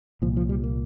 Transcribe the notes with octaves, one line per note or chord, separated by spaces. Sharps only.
C2 A#2 F3
F3
G3
A#3